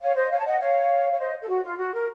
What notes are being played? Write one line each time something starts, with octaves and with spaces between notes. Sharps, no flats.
C#5 F5
C5 D#5
C#5 F5
A5
D#5 F#5
C#5 F5
C#5
C5 D#5
A4
F#4
F4
F#4
A#4